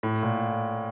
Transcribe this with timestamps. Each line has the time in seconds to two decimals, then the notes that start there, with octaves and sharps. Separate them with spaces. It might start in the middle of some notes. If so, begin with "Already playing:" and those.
0.03 A2
0.23 A#2